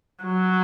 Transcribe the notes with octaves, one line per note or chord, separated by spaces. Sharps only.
F#3